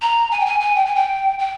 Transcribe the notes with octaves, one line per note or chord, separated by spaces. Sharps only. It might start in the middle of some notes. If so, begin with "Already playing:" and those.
A#5
G#5
G5
G#5
G#5
G5
G#5
G5
G5